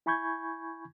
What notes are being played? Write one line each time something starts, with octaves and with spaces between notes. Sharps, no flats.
E4 G#5 B5 C#6 G6 G#6